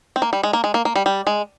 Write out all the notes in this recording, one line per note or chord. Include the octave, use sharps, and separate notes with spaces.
C4
A#3
G3
G#3
A#3
G#3
A#3
A#3
G3
G3
G#3